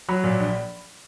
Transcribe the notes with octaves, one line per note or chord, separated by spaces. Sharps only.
F#3 B5
A#2
A#1